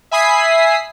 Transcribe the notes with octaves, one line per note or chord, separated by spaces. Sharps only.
E5 G#5 B5 D#6 B6 C7